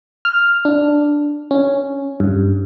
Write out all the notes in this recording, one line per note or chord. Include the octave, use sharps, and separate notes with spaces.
F6
D4
C#4
G2